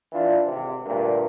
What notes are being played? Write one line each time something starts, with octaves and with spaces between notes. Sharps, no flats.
E3 D4 F4
G#1 C3
D2 G2 A#2